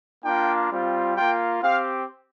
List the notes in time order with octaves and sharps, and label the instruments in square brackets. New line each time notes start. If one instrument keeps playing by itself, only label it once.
[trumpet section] A#3 D4 F4 G5
G3 C4 F4
A#3 F4 G5
C4 G4 F5